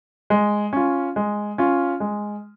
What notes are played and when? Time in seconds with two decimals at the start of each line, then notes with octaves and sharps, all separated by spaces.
0.30 G#3
0.73 C#4 F4
1.16 G#3
1.58 C#4 F4
2.00 G#3